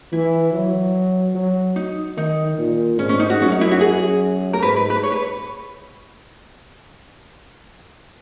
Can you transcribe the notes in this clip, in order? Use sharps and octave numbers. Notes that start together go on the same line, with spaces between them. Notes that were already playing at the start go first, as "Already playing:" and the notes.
E3 E4
F#3
F#3
D#4
D#3 D#4
A#2
G#2 C#4
C#4
D#4
F#4
F#2 C#4
D#4
E4
F#4
F#2 G#4
A#4
G#2 B4
B4
B4
C#5
B4